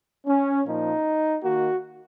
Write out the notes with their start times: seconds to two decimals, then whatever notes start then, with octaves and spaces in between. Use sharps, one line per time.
0.26 C#4
0.65 A#2 F3 A#3 D#4
1.42 D#3 A#3 F#4